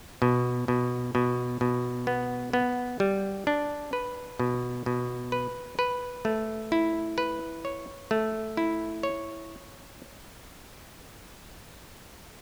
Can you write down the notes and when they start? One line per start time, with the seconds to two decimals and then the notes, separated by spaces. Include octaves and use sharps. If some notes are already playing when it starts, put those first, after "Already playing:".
0.22 B2
0.68 B2
1.15 B2
1.61 B2
2.07 B3
2.53 B3
3.00 G3
3.47 D4
3.93 B4
4.39 B2
4.86 B2
5.32 B4
5.79 B4
6.25 A3
6.72 E4
7.18 B4
7.65 C#5
8.11 A3
8.57 E4
9.03 C#5